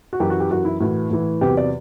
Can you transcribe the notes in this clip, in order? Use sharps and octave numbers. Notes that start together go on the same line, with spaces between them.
F#4
F#2 E3 G4
F#4
G4
F#2 E3 F#4
E4
A2 E3 F#4
A2 E3
E2 C3 F#3 G4
D5